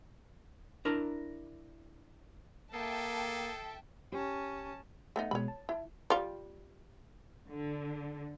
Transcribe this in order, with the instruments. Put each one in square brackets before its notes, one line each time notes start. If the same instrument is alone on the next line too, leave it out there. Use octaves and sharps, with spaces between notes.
[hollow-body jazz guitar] D4 E4 A#4 A#5
[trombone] A#3 [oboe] G#4 [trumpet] A4 [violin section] E5 G5 A5
[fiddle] C#4 A5 [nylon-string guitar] G4
[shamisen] A3 B3 D#4
[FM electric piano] B2 G#3 [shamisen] C#5 B5
[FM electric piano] A5
[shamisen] E4
G3 F4
[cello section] D3